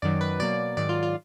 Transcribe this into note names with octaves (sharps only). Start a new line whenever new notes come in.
F#2 D#3 F#3 D5
B4
B2 F#3 A#3 D5
G#2 D#3 F#3 D5
F4
F4